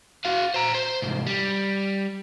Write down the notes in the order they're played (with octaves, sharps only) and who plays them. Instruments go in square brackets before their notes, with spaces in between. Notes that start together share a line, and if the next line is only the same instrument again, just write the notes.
[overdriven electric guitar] F#4 F5
C5 A#5
C5
C2 G#2
G3